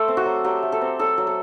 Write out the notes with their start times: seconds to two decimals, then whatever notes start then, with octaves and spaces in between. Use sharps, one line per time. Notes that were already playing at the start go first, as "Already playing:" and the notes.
Already playing: A3 A4 C5 D5
0.08 C4
0.17 F#4
0.26 F#3
0.44 F#3 G4
0.63 A3
0.72 A4
0.81 C4
0.99 F#3 A4
1.18 F#3
1.27 A4